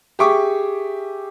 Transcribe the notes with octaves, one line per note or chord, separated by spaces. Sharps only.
G4 G#4 E5 C#6 D6